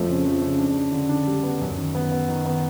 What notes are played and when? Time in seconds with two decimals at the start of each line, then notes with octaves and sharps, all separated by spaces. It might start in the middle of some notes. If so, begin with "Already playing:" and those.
Already playing: F2 F3 A3
0.09 C#3
0.25 F3
0.42 C#3
0.59 D4
0.75 D4
0.92 D3
1.09 D4
1.27 G3
1.43 B3
1.61 F#2
1.78 D#3
1.95 B3
2.12 B3
2.28 D#3
2.46 B3